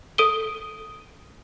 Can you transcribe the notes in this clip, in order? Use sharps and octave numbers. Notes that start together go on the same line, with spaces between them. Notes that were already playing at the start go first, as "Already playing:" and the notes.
A4 D#6 D7 D#7 G7